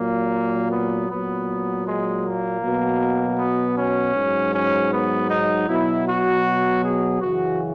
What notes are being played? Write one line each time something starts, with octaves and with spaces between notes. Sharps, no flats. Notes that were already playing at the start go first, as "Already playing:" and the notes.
Already playing: A#2 F#3 A#3
B3
A#2 F#3 B3
G#3
A#3
B2 F#3
B3
C#4
G#2 F#3
C#4
B3
D#4
B2 F#3 E4
F#4
G#4
F#2 C#3 E3 F#4